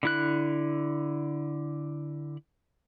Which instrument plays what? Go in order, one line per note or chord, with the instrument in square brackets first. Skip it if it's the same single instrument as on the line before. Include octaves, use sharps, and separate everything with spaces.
[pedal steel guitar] D3 E4 F#6